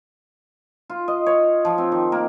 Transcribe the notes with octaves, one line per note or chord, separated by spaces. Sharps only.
F4
D#5
C#5
F3
C4
D#3
A#3